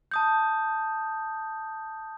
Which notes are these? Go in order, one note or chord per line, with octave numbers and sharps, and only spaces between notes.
A5 D#6 G6